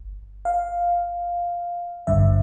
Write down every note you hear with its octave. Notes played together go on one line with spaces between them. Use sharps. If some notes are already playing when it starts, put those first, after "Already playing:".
Already playing: G1
F5
G#1 G2 D3 E5